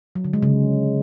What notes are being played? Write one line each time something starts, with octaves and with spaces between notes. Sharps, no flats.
F#3
D3
G#3
C#3